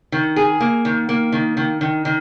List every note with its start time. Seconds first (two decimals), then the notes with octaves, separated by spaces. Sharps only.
0.12 D#3
0.36 G#4
0.60 A#3
0.85 D#3
1.09 A#3
1.32 D#3
1.57 D#3
1.81 D#3
2.05 D#3